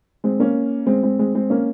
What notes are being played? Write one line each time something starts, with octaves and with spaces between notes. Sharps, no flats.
G#3 C4
A#3 C#4
G#3 C4
G#3 C4
G#3 C4
G#3 C4
A#3 C#4